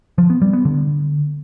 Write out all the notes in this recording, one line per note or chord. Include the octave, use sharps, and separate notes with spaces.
F3
B3
G3
B3
D3